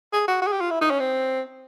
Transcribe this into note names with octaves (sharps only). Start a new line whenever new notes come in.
G#4
F#4
F#4
G#4
G4
F4
E4
D#4
C#4
C4